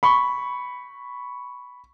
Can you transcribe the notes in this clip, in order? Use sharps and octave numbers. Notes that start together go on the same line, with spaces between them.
B5 C#6